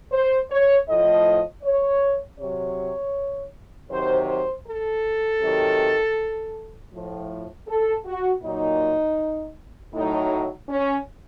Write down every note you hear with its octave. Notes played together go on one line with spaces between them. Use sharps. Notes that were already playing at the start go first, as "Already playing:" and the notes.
C5
C#5
A2 F3 D#5
C#5
C3 F#3 C#5
C3 D#3 F#3 C5
C5
A4
C3 D#3 F#3
A2 F3
A4
F#4
A#2 F#3 D#4
A2 F#3 D#4
C#4